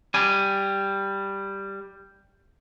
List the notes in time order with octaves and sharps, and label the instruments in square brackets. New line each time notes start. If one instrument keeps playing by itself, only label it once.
[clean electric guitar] G3 G#5